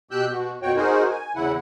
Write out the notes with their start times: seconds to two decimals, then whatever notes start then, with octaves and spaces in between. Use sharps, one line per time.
0.11 B2 G4 E6 F#6 G6
0.31 B2 F#4
0.62 F2 B2 F#4 C#5 G5
0.77 D#4 F#4 G#4 A#4 C5
1.10 G#5
1.35 E2 C#3 E4 F#5